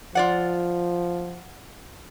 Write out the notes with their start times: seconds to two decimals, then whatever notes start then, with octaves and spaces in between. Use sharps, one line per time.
0.15 F3 F4 D5 F#5